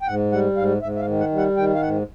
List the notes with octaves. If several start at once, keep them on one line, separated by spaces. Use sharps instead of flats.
G5
G#2 F#5
G3 F#5
G#2 F5
G#2 E5
E5
F5
D#3
F#5
G3
F#5
D#3 G5
F5
G#2 F#5